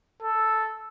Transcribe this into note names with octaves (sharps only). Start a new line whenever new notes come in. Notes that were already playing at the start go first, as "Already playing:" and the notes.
A4